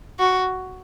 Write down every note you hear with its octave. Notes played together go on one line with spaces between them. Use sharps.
F#4